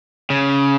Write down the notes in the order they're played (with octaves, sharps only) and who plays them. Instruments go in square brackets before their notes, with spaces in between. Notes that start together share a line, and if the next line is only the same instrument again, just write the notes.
[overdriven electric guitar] C#3